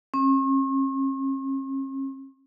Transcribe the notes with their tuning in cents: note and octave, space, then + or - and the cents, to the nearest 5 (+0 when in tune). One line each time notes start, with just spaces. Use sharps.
C#4 -45